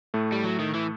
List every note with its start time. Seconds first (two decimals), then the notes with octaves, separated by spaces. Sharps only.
0.14 A2 A3
0.32 G3
0.44 F#3
0.59 D#3
0.74 E3